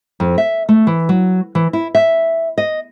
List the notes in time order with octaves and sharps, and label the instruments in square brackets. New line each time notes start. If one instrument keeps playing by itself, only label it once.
[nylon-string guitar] F2
E5
A3
E3
F#3
E3
E4
E5
D#5